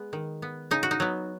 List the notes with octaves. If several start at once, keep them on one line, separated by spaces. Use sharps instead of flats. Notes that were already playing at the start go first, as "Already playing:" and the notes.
Already playing: G#3 B3
D#3
B3
C#3 D#4
F#4
D#4
F#3 B3